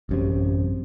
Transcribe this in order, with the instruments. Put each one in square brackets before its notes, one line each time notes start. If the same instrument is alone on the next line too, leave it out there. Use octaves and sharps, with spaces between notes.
[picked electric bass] A1 F#2 C3